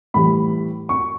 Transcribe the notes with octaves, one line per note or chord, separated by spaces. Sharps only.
A2 E3 G3 B5
C#6